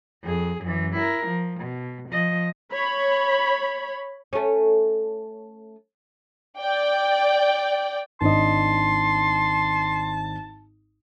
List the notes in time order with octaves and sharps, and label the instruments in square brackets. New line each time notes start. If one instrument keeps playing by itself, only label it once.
[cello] F2 G#4
F#2 E3
E4 A#4
F3
B2
F3 D#5
[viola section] C#5 B5
[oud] A3 C#4
[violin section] D5 G5
[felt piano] G#1 D4 D#5 [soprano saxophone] A5 [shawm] C6